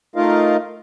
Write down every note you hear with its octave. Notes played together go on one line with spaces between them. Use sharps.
A3 D#4 F4 A#4 D#5 F5